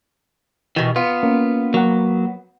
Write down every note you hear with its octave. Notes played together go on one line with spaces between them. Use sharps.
B2 D#3 E3
B3 F4
A#3 C#4
F#3 A#3 F#5